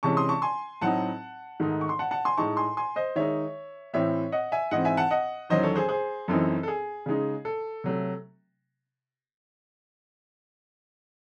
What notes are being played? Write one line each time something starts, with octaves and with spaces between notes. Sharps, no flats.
C3 E3 G#3 C#4 A5 C#6
C6 D#6
A5 C#6
G#5 C6
A2 F#3 C4 D#4 F#5 A5
G#2 D#3 A3 D#4
C#6
C6
F#5 A5
F#5 A5
G#5 C6
A2 G#3 D#4 A5 C#6
G#5 C6
G#5 C6
C5 D#5
D#3 G#3 D#4 C#5 E5
A2 E3 C4 C#5 E5
D#5 F#5
E5 G#5
G#2 E3 C4 D#5 F#5
E5 G#5
F#5 A5
D#5 F#5
E2 D#3 F#3 C#4 C5 D#5
A4 C#5
G#4 C5
G#4 C5
F#2 E3 C4 D#4 A4
A4
G#4
C#3 G#3 D#4
A4
C3 F#3 A3